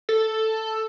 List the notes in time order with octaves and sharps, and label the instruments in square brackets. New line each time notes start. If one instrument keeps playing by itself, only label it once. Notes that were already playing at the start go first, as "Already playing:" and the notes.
[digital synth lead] A4